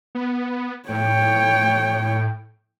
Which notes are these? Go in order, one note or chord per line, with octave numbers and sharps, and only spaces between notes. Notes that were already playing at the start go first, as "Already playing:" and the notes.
B3
A2 C#5 G5